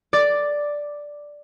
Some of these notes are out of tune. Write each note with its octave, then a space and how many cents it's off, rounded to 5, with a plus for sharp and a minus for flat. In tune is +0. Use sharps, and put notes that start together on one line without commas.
D5 +0 D6 +5